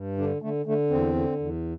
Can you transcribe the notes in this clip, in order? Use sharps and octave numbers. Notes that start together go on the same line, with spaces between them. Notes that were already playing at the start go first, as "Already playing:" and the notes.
Already playing: G2
D3 D4
D3 A3
D3 A3
E2 C4
D3
E2